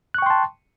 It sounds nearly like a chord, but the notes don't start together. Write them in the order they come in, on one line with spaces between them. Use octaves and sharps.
F#6 C#6 G5 C6 A5